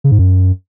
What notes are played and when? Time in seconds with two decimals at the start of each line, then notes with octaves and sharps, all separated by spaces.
0.04 C#3
0.11 G#2
0.19 F#2